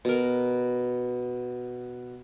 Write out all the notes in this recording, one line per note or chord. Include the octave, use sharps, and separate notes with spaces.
B2 A#4